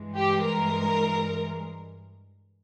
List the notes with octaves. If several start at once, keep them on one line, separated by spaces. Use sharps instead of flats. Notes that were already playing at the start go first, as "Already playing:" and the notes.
Already playing: G2 E3 G#3
G4
A#4